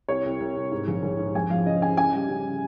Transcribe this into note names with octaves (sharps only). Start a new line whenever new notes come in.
C2 C#5
C2
C2
C2
G#2
A#1
A#1
G#2
F2 G#5
F3 F5
C#3 D#5
C#3 G#5
C#3 G#5
G3
C#3